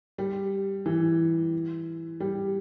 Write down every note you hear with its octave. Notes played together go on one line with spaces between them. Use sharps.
G3
E3
G3